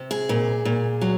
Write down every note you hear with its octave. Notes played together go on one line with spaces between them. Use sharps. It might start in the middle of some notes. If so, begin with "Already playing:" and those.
Already playing: C3
G#4
A#2
A#2
F#3